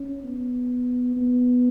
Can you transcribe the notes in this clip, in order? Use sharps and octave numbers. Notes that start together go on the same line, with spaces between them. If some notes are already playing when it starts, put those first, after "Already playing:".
Already playing: C#4
B3
B3